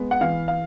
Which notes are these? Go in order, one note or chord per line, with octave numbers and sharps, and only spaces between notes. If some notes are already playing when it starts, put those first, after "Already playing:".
Already playing: G#3 B3
F#5
E3 F5
F5